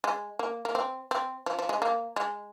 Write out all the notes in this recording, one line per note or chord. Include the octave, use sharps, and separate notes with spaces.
G#3
A#3
A#3
C4
C4
F3
F3
G#3
A#3
G#3